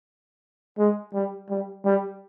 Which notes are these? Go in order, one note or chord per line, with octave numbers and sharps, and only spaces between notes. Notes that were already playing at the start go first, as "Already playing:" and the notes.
G#3
G3
G3
G3